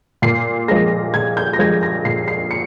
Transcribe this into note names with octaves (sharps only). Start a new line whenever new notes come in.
A#2 C7
F3 G#3 A#6
A#2 G#6
G6
A#6
F3 G#3 G#6
A#6
A#2 C7
C7
C#7